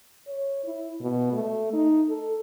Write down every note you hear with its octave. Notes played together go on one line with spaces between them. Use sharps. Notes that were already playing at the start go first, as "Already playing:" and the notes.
C#5
E4
B2
A3
D#4
A4